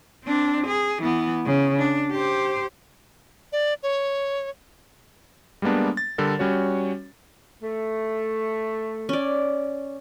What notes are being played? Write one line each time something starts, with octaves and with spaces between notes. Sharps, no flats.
C4 D4
G#4
E3 B3
C#3
D4
G4 C5
D5
C#5
G3 G#3 A#3 B3 D4
A6
D3 G3 A4 A#4
G3 C#4 F#4 C#5
A3
C#4 D5